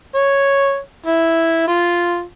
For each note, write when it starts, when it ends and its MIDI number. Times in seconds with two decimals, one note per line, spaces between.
0.15 0.78 73
1.06 1.67 64
1.68 2.22 65